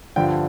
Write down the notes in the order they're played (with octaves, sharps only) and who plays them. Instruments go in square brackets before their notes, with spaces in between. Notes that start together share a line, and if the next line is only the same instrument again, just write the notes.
[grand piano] G2 D3 F3 G5